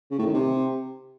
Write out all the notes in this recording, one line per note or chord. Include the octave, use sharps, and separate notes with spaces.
C#3
A2
D#3
C3